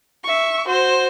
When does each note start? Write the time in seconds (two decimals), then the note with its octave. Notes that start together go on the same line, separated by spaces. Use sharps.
0.24 E5 C#6
0.67 F#4 C5